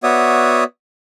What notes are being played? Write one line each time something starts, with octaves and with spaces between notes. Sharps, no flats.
B3 F#4 C#5 D5 E5 D#6